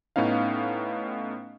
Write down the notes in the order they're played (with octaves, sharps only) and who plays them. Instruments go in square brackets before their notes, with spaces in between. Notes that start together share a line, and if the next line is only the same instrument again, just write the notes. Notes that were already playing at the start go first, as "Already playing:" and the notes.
[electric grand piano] A2 B3 C#4 D#4 F5